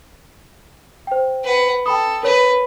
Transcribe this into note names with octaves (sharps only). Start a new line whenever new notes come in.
C5 G5
B4 F#5
A4 G5 B5 D#6
A#4 B4 C#5